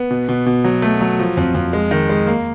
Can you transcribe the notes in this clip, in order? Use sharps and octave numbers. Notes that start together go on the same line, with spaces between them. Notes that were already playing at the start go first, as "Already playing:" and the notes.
Already playing: B3
B2
B2
B2
F#3
A3
F#3
F3
F2
F2
G#3
D#3
G#3
A#3